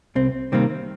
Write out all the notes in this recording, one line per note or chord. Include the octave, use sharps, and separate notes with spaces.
C2 C4
C3 D#3 G3 A#3 C4